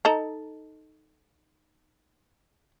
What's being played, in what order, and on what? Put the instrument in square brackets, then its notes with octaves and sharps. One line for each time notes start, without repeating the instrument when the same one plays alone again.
[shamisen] D#4 A4 A#5